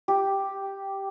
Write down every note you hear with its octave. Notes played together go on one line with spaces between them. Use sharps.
G4